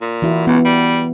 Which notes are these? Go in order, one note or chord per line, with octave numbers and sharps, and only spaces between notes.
A#2
E3 E4 F#4
C#2 B3
G3